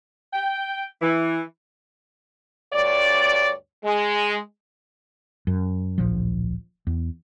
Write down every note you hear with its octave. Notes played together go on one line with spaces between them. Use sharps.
G5
E3
D2 G2 C#5 D5
G#3
F#2
D1 A#1 F3
E2